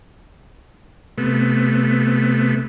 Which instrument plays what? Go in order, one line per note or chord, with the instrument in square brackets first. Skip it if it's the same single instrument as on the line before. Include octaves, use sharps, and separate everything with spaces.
[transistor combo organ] C3 A3 B3